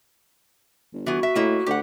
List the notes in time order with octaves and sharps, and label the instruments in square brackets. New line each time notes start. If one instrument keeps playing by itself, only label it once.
[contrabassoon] G1
[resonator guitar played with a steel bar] E3 B3 [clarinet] F#4
[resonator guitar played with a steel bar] E5
[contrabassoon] A2 [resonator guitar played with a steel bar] A#3 E4 D#5
[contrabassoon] D2 [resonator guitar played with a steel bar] G4 F#5